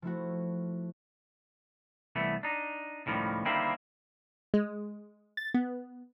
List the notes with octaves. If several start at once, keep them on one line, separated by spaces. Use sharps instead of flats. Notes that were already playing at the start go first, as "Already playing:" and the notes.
F3 A3 E4 F#4
C2 E3 A3 B3
D4 D#4
C#2 A2 D#3 F3 G3
D3 D#3 G3 A#3 C4 E4
G#3
A6
B3